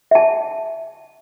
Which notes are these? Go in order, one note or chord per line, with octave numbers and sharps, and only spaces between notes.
E5 A5